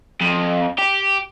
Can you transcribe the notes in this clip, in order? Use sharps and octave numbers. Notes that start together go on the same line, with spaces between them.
F2
G4